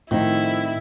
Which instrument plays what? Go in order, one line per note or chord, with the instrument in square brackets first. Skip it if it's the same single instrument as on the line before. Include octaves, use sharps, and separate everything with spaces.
[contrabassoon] F2 [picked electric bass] A2 [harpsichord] D#3 [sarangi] E4